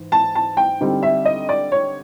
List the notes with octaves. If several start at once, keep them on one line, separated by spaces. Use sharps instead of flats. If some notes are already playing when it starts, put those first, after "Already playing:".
Already playing: G#2 E3
A5
A5
G5
D3 G3 C4 D#4
E5
D#5
D5
C#5